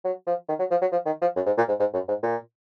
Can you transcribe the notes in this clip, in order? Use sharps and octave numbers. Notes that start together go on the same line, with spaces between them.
F#3
F3
D#3
F#3
F3
F#3
F3
D#3
F3
F#2
G#2
A#2
G#2
G#2
F#2
G#2
A#2